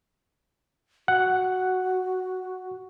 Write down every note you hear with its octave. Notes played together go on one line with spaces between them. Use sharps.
F#4 F#5